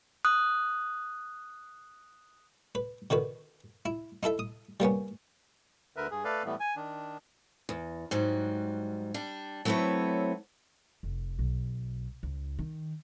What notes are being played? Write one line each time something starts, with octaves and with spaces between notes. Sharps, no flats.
D#6 F#6
B4
D3 D#3 F#4 B4
E4
D#4 E4 A4 E5
D#6
G3 A#3 B3 C#4
D2 D3 A#4 B4 E5
G2 G#4
A3 A4 B4 D5 F5
A2 E3 G3 A3 B3
G#5
D#3 D4
E2
G#2 F#3 G3
G3 D4
F#3 A3 B3 C4 E4 C#5
F1
B1
C#2
D#3